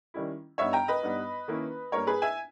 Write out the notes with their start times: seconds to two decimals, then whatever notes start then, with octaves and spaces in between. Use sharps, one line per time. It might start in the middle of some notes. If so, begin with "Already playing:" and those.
0.14 D#3 G3 C#4 E4
0.58 G2 G3 B3 D#4 C#5 E5
0.73 G5 A#5
0.88 B4 D#5
1.03 G2 G3 B3 D#4
1.48 D#3 A#3 C#4 E4
1.92 G2 G3 A#3 A#4 C#5
2.07 G#4 B4
2.22 E5 G#5